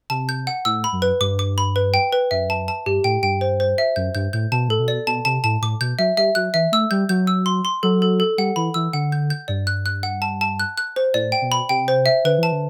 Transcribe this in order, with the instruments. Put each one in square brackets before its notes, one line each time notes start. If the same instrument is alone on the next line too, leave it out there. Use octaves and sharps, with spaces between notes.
[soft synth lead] C3 [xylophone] A5
[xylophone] G6
F#5
[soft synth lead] A2 [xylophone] E6
[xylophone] B5
[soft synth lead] F#2
[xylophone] B4
[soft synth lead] G2 [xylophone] D6
[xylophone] D6
B5
B4
G5
B4
[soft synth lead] F#2 [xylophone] E5
[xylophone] A5
A5
[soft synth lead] G2 [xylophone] G4
[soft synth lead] A2 [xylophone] G5
[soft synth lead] G2 [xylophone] G5
[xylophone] C5
C5
E5
[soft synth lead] F#2 [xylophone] G6
[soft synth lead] G2 [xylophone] G6
[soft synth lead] A2 [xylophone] G6
[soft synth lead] B2 [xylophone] A5
[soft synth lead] A2 [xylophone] A4
[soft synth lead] B2
[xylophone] D5
[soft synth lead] B2 [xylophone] A5
[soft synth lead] C3 [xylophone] A5
[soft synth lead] A2 [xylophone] A5
[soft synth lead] A2 [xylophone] D6
[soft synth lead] B2 [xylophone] G6
[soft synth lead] F#3 [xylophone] E5
[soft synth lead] G3 [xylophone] E5
[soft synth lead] F#3 [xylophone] F#6
[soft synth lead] E3 [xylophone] E5
[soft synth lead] A3 [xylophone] E6
[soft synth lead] G3 [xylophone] G6
[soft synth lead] F#3 [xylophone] G6
[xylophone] E6
C6
C6
[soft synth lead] F#3 [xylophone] A4
[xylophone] A4
A4
[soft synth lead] G3 [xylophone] F#5
[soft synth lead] E3 [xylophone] B5
[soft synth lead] E3 [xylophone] E6
[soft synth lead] D3 [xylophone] F#5
[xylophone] G6
G6
[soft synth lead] G2 [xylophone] D5
[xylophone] F#6
F#6
F#5
A5
A5
F#6
F#6
C5
[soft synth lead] A2 [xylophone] D5
[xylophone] G5
[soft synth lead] B2
[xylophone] B5
[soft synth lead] C3 [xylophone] G5
[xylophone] C5
E5
[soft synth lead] D3 [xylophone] B4
[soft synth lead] E3 [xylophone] A5
[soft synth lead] D3